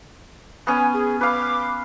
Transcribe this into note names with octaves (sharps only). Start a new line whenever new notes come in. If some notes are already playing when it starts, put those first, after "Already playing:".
B3 C#4 G#5
G#4
B4 F5 D6